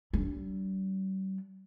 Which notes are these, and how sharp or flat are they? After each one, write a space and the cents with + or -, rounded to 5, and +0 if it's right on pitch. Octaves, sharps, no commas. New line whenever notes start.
G3 -45 D4 -30